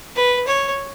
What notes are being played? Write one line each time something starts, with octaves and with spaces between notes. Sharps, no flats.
B4
C#5